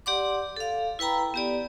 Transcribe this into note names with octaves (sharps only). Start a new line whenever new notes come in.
G4 D5 F#5 C6 D6
A4 F5
E4 B4 G5 A#5 B5
B3 G4 D5